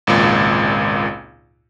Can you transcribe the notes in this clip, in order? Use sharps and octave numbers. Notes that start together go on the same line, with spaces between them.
G#1 C#2 A#2